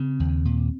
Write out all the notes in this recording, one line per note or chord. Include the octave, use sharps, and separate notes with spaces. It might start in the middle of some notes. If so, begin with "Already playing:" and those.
Already playing: C#3 C4
D#2
A#2